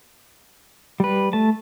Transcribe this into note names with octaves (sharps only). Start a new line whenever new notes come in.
G3 B4
A3 A5